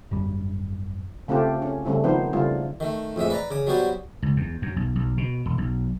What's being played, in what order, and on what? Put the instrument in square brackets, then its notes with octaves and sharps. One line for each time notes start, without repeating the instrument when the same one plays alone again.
[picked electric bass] G#1 F#2 G3
[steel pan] C#3 A3 C4 F4 G4
C#4
C#3 G3 A3 C4 E4
D#3 F3 B3 D#4 C5
C#3 G3 A3 A#3 E4 F4
[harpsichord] D#3 A3
F2 A2 G#3 E5
B4 D5 A#5
C#3 D6
F#3 G3 B3 F#4 C5 D5
[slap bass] C#2
E2
F#2
B1
B1
B2
E1
B1